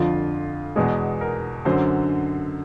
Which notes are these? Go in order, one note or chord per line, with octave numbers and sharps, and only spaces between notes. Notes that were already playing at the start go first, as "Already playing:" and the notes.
Already playing: F2 D3 F3 F4
E2 B2 G#3 G#4
A#4
F#2 D3 F#3 C5